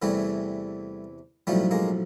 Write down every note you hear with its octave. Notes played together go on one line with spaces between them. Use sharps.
E2 C3 E3 G3 A3
B1 A2 F3 G3 A3
G#3 A#3